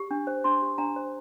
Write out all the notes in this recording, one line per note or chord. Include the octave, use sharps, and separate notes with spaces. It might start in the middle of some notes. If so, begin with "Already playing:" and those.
Already playing: G4
D4
C5
D4 C6
G4
D4 A#5
C5